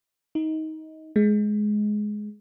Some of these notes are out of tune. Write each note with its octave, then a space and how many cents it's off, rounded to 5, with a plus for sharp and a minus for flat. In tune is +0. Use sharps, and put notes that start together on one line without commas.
D#4 +20
G#3 +15